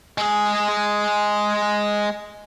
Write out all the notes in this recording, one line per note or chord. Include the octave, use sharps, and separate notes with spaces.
G#3 G#4